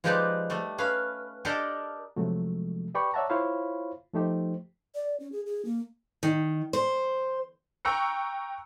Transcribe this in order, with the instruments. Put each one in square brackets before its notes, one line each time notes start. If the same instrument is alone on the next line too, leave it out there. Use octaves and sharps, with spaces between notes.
[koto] F3 G#3 D#4 G4 B4 D5
G3 A3
C#4 B4 F5
D4 G4 A4 A#4 D5 D#5
[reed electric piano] C3 F3 F#3 G#3 A3
G4 B4 D5 G5 B5 C#6
C#5 D5 E5 F#5 A5 A#5
E4 F4 C5 C#5 F5 B5
F3 A3 D#4 G4 C5
[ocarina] D5
C#4
G#4
G#4
A#3
[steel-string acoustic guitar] D#3
C5
[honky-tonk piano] G5 A#5 C#6 E6 F#6 C#7